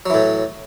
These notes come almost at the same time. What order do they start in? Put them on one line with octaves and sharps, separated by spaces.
F#3 E3 A2